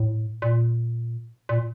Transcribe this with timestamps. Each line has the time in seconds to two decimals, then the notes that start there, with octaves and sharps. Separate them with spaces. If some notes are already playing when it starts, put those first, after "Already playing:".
Already playing: A2
0.42 A#2
1.49 A#2